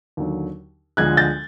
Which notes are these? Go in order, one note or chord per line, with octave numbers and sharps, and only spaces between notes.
D#2 D3 F#3
D2 D3 F3 G#3 F#6 G#6
G6 A6